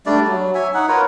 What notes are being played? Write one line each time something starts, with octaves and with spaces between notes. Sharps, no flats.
G3 A3 D4 D5
F#3
C#5 E5 G#5
D#4 F#5
F4 A#4 B4 C#5